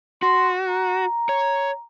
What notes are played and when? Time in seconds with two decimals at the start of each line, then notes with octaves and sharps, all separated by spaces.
0.23 F#4 C6
0.69 A#5
1.29 C#5